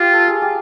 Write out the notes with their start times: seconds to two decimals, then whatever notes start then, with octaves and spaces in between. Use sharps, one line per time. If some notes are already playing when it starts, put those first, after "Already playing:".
Already playing: F4 G4
0.13 A4
0.28 G#4
0.42 G4